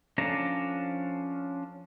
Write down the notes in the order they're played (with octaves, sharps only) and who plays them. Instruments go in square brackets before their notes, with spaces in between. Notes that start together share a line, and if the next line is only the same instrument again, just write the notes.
[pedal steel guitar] F3 C#4 D4 A4 A#5